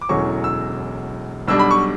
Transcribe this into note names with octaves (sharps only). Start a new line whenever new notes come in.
D6
E1 E2 D3 F#3 C#4 C#6
E6
B1 B2 G3 D4 E6
B5
C#6